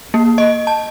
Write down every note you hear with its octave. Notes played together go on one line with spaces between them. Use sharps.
A#3
D#5
A5